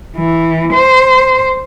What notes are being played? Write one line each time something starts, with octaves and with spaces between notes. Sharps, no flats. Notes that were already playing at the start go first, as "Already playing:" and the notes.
E3
C5